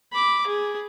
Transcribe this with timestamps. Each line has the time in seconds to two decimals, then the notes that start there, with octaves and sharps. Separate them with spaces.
0.13 B5 D6
0.47 G#4